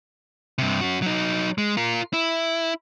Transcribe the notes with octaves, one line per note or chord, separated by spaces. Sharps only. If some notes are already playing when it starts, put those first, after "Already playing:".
G2 C3
C#4 F#4
F#3 D#4
G#3
F4 A#4
E4